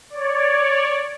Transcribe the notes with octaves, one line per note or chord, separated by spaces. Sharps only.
C#5 D5